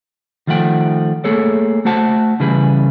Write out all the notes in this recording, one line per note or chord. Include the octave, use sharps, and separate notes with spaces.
D#3 F3 A3 F#5 G5
A3 A#3 G#4 A4 C#5
A3 F#4 C5 F#5 A5
C#3 E3 G3 E4 G#4 B4